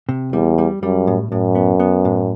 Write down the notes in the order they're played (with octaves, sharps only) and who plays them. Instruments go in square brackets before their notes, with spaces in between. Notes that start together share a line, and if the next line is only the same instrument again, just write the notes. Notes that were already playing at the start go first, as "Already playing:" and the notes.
[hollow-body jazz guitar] C3
[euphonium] E2 [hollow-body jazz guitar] G3
[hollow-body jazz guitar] G3
[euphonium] F#2 [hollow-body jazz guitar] G3
[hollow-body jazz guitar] A2
[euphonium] F#2 [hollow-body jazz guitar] A2
[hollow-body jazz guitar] B3
B3
A2